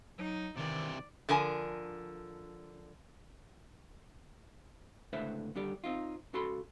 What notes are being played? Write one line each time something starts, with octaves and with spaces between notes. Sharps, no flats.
F#3 D#4
C3 D#3 E3 D5
D3 F3 A#4 G#5
C#2 A2 D3 B4 C5 E5
D#2 D3 G3 G4 D5
C4 D#4 F4
C#2 C#3 F#4 A4 B5 C6